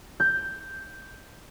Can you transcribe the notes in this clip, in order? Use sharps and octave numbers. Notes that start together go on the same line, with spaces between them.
G6